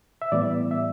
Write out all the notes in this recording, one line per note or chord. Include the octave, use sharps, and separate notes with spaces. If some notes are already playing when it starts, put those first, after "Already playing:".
E5
A2 E3 G3 B3 D5
E5